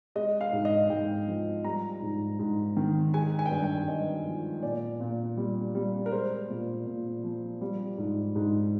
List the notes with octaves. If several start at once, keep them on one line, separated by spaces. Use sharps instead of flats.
G#3 D#5
F5
G#2
D#5
G#2 G5
F3
G3 A#5
G#2
G#2
D#3
G#3 G#5
G#5
G5
G2 G#5
G5
G2 D#5
F3
A#2 D5
A#2
G3
G3
A#4
G#3 C5
A#2
A#2
F3
G3
G#2
G#2